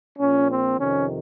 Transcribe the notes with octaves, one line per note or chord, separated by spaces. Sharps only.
A#1 A#2 C#4
C4
F2 C3 D#3 C#4